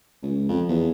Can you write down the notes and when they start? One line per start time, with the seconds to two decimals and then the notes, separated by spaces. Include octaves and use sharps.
0.23 C#2
0.49 F2
0.69 E2